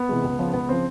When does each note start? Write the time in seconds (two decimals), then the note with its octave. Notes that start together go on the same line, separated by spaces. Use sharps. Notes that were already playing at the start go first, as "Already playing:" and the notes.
Already playing: B3
0.09 C3 E3 G#3
0.24 C#2
0.39 C#3 F3
0.53 C#2 B3
0.68 C#3 F3 C4